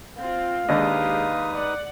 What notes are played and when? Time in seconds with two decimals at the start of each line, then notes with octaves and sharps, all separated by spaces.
0.18 C4 F4 F5
0.69 D#2 G#3 D4 D#4 G4 B4 D#5 D#6
1.54 D5 F#5